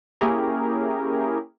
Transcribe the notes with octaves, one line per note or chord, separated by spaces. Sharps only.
A#3 C#4 E4 G4 G#4 A#4